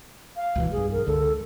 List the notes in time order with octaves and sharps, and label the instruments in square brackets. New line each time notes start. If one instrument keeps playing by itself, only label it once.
[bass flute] F5
[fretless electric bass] C#2 B2 E3
[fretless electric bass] B1 G2 [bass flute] G#4
[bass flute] A#4
[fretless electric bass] C#2 D3 [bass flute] A4